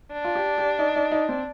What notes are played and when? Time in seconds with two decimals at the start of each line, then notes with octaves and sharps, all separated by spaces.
0.13 D4
0.24 F4
0.35 G4
0.58 G4
0.79 D#4
0.96 D#4
1.12 D#4
1.29 C4